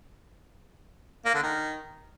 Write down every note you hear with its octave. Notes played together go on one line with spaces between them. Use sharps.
A#3
D3
D#3